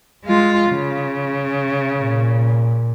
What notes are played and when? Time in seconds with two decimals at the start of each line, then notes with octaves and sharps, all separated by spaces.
0.25 G#3 F4
0.70 C#3
1.99 A#2